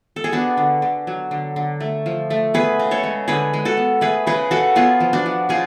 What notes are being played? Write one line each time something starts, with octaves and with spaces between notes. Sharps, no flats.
A4
G#4
B3 D4 F#4
D3
D3
F#3
D3
D3
A3
F3
A3
B3 G#4 B4
C#3
A4 C#5
G#3
D3 G#4 B4
G#3
F#4 A4
B3
A3 G#4 B4
C#3 G#4 B4
C#3 F#4 A4
B3 F4 G#4
F3
D4 F#4
F3
C#3 F4 G#4